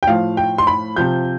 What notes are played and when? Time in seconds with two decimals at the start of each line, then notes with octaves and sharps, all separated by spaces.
0.03 G5
0.07 A2 F3 F5
0.37 G5
0.58 C6
0.67 B5
0.96 C3 F3 G6